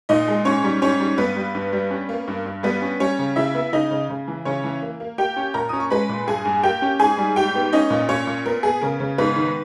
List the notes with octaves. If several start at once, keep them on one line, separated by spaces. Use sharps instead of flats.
A#2 D#4 D#5
G#3
G#2 C#4 C#5
G3
G#2 C#4 C#5
G3
G2 B3 B4
G3
G2
G3
C#4
A#3
G2
G2
G3 B3 B4
C#4
G3 C#4 C#5
C#3
C#3 E4 E5
B3
C#3 D#4 D#5
C#3
C#3
E3
C#3 C#4 C#5
E3
A#3
A#3
A#3 G4 G5
C#4
A#2 A#4 A#5
C#4 D#6
C#6
G#3 B4 B5
A#2
G2 G#4 G#5
G2
A#3 G4 G5
C#4
G#2 G#4 G#5
G3
G#2 G4 G5
B3
C#4 D#4 D#5
A#2
A#2 C#4 C#5
A#2
B3 A#4
B3 G#4
C#3 A#4
C#3
G#2 B3 B4
D#3